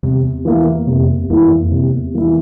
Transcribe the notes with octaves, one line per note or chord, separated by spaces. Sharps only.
E2 C3
E3 A#3 E4
F2 C3
E2
E2 E3 A#3 E4
G2
F2
E2 C3
E3 A#3 E4